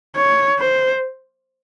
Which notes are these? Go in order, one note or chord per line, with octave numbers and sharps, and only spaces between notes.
C#5
C5